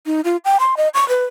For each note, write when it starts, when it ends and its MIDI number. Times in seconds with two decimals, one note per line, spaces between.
0.06 0.21 63
0.24 0.37 65
0.45 0.58 79
0.60 0.75 84
0.77 0.88 75
0.94 1.07 85
1.09 1.25 71